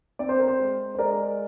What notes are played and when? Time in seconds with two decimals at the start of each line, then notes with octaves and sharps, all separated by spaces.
0.19 C4 D5
0.29 C5
0.39 A#4
0.48 C5
0.59 G#3
0.95 C5
0.98 G#3 A#4 D5